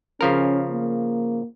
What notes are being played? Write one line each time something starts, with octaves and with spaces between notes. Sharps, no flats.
C#3 F3 C#4 A#4
A#3